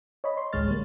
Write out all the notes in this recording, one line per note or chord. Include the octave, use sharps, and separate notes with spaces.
C#5 D#5 B5
C6
A1 D2 G#3 C#5 F6 A6
G3 A#3